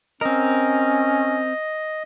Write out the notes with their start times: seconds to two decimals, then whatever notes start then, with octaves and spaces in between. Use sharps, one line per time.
0.21 C4 C#4 A#4 D#5